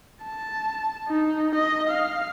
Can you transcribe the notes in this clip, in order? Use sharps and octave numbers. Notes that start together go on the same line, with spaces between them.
A5
D#4
D#5
F5